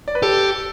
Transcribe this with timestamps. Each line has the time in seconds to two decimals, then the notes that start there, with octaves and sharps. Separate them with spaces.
0.08 D5
0.15 B4
0.23 G4 A4